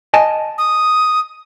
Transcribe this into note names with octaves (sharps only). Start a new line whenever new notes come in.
D#5 G#5 A5
D#6